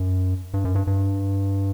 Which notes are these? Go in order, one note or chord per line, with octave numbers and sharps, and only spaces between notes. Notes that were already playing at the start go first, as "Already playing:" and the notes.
Already playing: F#2
G2
F#2
G2
G2